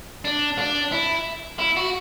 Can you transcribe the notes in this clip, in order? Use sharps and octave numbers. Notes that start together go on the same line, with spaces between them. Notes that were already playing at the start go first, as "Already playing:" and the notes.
D4
D4
E4
E4
F#4